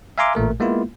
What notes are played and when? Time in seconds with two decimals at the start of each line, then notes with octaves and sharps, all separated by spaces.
0.18 E5 F5 G#5 A#5 C6 D6
0.35 A1 A#2 A3 A#4
0.60 G#3 A#3 B3 E4 F4